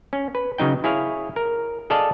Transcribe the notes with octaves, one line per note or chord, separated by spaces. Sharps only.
C#4
B4
C#3 F#3 D#4 G5
E4 G#4 C#5 F5
A#4
G#4 A4 D5 D#5 F5 A5